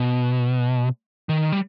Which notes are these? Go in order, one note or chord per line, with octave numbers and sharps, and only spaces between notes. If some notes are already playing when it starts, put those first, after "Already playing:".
Already playing: B2
D#3
G3